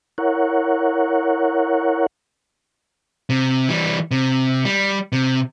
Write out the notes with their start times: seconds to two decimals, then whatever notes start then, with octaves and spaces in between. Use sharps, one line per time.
0.18 E4 A#4 C#5 F#5
3.30 C3
3.69 E3 G3
4.11 C3
4.65 G3
5.13 C3